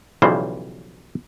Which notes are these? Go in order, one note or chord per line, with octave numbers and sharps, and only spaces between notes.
B1 C#3 E3 F3 G3 C5